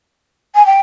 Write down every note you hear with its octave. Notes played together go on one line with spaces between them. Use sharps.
G#5
G5